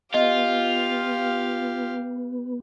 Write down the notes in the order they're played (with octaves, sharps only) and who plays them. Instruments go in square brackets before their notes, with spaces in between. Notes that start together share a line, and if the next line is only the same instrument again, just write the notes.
[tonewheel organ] B3 [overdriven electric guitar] F4 [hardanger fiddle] G4 F5 [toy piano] D#5